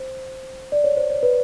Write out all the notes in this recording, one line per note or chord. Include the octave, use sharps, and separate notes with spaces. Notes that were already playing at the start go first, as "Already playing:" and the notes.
Already playing: C5
D5
C#5
C5
C#5
B4